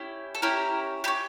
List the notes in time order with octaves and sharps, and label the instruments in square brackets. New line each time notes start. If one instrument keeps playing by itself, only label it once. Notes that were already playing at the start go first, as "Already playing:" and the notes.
Already playing: [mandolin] C#4 E4 G4
A4
C#4 E4 G4 A#4
E4 G4
C#4